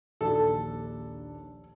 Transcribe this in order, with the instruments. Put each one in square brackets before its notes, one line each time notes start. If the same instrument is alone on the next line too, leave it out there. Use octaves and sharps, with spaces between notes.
[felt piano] A#1 D#2 D4 [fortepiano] A4